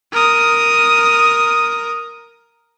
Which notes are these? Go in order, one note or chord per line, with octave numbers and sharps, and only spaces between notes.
A#4 D#6